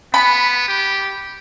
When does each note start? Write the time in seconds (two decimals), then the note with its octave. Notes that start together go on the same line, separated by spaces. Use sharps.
0.14 B3 B5
0.68 G4